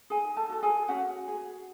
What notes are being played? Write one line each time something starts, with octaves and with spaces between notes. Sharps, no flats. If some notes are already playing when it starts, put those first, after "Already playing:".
D#4 G#4 G#5
A4 A5
F#4 A4
G#4 G#5
C#4 F#4 F#5
G#4